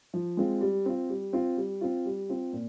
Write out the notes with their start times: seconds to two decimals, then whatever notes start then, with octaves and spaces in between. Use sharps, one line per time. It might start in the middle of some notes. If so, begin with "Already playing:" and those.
0.14 F3
0.37 G#3 C4 F4
0.61 G3
0.86 C4 F4
1.09 G3
1.33 C4 F4
1.57 G3
1.81 C4 F4
2.05 G3
2.29 C4 F4
2.53 A#2